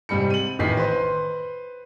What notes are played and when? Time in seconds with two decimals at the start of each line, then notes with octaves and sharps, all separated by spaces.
0.09 G#2 C3 G3 B5 C#7
0.30 D#7 F#7
0.59 A1 D#3 B4 B6 C7
0.77 B4 C5 C6